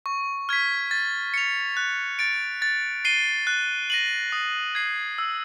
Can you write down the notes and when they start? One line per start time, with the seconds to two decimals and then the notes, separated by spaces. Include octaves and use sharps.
0.06 C#6
0.49 F6 G#6 B6
0.91 A6
1.34 C#7 F7
1.77 F#6
2.19 A6 D7
2.62 A6
3.05 C7 D#7 G7
3.47 F#6
3.90 A#6 D#7 F#7
4.32 D#6
4.75 G#6 C7
5.18 E6